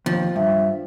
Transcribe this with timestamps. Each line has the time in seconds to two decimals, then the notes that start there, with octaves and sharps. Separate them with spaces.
0.06 D#2 F3
0.36 G2 E5